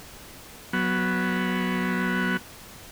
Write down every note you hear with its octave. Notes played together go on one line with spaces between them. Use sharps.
F#3 B3